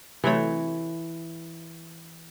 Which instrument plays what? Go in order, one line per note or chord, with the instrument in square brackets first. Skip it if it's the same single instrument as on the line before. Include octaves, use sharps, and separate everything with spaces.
[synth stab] C3 F#3 A3 [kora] E3 C#5